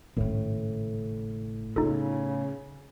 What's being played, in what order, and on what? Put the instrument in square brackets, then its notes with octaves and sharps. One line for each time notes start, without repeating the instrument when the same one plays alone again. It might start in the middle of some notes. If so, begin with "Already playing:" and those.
[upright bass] G#1 C#3 [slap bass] A2
[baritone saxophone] C#3 [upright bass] B3 [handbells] D#4 F4 A4